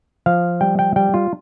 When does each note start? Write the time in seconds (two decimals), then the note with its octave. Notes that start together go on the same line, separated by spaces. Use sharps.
0.26 F3 F5
0.61 G3 G5
0.79 G5
0.96 G3 G5
1.14 F4